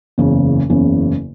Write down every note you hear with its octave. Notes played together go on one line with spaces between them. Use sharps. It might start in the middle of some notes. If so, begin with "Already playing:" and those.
F#1 E2 C#3
F#1 E2 C#3